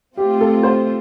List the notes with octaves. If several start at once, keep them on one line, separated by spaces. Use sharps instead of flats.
A3 C4 F4 G4
A4
C5